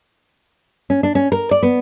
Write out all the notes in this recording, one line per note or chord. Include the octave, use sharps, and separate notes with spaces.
C#4
D4
C#4
A#4
D5
B3